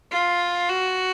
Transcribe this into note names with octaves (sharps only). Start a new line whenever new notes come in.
F4
F#4